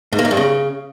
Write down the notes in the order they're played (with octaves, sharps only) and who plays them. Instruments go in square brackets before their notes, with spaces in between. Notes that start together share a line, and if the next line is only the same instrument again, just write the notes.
[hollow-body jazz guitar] G#2
A#3
G#2
G2
C#3